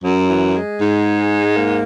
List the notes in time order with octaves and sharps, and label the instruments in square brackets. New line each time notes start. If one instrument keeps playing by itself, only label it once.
[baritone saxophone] F#2 [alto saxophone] F#3
[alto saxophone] E3
G#3
[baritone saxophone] G#2
[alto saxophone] A#3